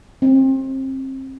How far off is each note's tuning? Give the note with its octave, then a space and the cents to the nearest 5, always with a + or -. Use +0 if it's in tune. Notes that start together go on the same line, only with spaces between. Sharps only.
C4 +30